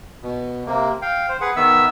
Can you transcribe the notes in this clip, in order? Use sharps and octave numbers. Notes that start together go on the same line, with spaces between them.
B2
C3 A#3
F5 G5
C5
G#4 B4 F#5
D#3 B3 E5 E6